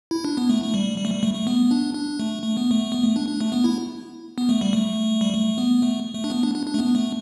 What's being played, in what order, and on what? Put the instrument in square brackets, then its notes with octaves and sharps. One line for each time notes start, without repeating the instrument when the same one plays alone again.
[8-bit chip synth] E4
D4
B3
A3
A3
G3
G3
A3
G3
A3
A3
B3
D4
D4
A3
A3
B3
A3
B3
A3
D4
D4
A3
B3
E4
B3
A3
G3
A3
G3
A3
B3
A3
A3
D4
B3
D4
D4
D4
A3
B3
A3